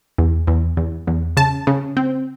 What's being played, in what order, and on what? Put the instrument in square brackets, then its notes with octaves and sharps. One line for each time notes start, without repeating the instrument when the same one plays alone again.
[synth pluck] E2
E2
E2
E2
C#3 A5
C#3
C4